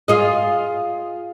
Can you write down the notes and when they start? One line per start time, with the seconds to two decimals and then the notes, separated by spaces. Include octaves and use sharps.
0.08 F4 G#4 D#5